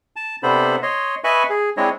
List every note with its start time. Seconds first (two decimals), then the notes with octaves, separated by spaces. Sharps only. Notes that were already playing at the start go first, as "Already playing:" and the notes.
0.16 A5
0.43 C3 B3 D4 A4 C5 B5
0.83 C#5 D#5 C6
1.24 B4 D#5 E5 G#5 B5 C#6
1.50 G#4
1.77 G#3 C4 D4 E4 C#5 D#5